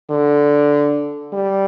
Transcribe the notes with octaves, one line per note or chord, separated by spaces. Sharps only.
D3
G3